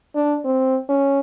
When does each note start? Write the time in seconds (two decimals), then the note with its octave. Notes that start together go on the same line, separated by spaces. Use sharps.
0.15 D4
0.45 C4
0.89 C#4